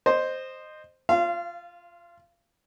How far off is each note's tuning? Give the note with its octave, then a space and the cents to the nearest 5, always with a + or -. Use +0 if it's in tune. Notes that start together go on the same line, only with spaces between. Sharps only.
C5 +0 D#5 -20
F4 +0 F5 -30